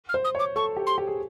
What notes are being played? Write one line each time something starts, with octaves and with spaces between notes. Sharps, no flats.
F6
C5
D#6
C#5
D6
A4 C#6
G4
C6
G4
G#4